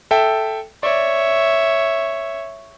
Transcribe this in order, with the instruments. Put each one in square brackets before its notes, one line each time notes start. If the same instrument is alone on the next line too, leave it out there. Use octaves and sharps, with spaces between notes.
[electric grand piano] A4 E5 G5
[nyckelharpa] C#5 E5 [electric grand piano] D5